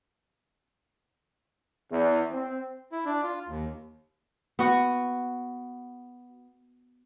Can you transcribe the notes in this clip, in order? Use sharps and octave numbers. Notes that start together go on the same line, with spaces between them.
E2
C4
E4
D4
F4
D#2
B3 F#4